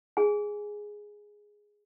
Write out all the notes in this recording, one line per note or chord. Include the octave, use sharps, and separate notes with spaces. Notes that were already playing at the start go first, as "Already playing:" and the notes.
G#4 G#5